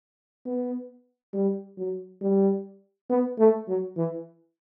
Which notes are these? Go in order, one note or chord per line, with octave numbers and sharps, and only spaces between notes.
B3
G3
F#3
G3
B3
A3
F#3
E3